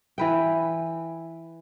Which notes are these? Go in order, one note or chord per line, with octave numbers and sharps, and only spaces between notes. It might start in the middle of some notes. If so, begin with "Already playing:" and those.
E3 B4 G5